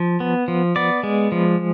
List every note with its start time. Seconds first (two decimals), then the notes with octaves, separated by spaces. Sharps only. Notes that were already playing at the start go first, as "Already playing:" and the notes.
Already playing: F3
0.20 B3
0.48 F3
0.76 B3 D5
1.03 G#3
1.32 F3